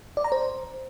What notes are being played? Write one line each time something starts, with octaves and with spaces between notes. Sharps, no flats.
D5
A#5
C5